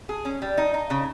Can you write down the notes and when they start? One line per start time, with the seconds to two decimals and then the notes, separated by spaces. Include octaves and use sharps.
0.09 G#4
0.25 C#4
0.42 G3
0.58 D#4
0.74 D#4
0.90 C#3